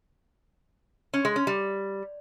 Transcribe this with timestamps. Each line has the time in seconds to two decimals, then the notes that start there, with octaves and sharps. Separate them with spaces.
1.14 C#4
1.25 G#3
1.36 C#4
1.47 G3